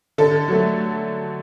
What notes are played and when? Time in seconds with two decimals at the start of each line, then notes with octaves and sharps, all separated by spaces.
0.18 D3 A4
0.48 F#3 A3